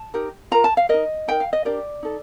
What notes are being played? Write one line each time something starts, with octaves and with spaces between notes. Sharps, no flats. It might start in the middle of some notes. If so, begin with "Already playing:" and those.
Already playing: A5
D#4 G4 A#4
F4 A#4 A#5
A5
F5
D#4 A#4 D#5
D#4 A#4 G5
F5
D#5
D4 G4 A#4 D5
D#4 A4